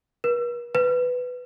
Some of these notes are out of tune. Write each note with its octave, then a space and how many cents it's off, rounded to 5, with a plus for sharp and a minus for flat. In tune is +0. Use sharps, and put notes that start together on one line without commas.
B4 -45
B4 +10